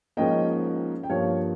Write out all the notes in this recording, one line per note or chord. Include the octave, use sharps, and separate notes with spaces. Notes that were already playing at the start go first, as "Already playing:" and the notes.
G#2 F3 A#3 C#4 D#5 G5
G5
G2 F3 A#3 C#5 F5